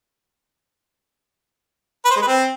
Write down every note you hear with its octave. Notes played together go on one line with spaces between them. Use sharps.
B4
C5
G#3
B4
C4